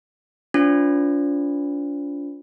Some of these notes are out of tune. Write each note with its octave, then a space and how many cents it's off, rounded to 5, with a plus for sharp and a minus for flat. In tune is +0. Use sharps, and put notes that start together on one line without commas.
D4 -40 F4 +0 C5 -35